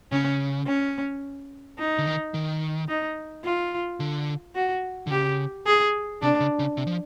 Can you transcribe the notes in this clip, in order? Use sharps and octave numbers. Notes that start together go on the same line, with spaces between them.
C#3 C#4
C#4
D#4
D3
D#3
D#3
D#4
F4
D3
F#4
D3
C#3 G4
G#4
C3 D4
C#3
C#3
C3
F3